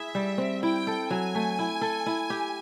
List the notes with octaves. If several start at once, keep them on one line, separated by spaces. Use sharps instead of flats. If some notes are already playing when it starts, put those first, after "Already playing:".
Already playing: E4 G#4 E5
G3
C4
E4 G5
A4
F#3 G#5
A3
E4
A4
E4
G4